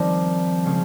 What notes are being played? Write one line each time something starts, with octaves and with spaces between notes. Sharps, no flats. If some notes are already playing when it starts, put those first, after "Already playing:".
Already playing: D#3 F3 G3 C4 D#4
C#3 G#3 C#4 G#4